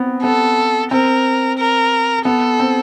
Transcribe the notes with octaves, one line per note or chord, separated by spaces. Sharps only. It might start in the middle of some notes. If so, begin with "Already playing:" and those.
Already playing: B3 C4
B3 A4
C4 A#4
A#4
B3 A4
C4